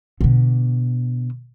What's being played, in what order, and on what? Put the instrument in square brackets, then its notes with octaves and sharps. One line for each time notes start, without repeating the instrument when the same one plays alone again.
[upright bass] B2 D3